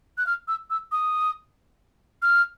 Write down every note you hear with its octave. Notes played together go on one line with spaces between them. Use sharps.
F#6
F6
E6
E6
D#6
F6